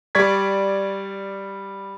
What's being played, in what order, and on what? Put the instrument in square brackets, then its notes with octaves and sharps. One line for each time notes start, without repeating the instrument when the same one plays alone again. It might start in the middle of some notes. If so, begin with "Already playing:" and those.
[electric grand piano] G3 D5 C#6 G#6 B6